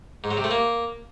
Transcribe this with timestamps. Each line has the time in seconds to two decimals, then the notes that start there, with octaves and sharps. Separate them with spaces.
0.24 G#2
0.31 F#3
0.37 C3
0.44 A3
0.51 A#3